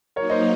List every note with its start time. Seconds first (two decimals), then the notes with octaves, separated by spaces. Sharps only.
0.16 F#3 A#3 D#4 A#4 C#5
0.30 C5 D#5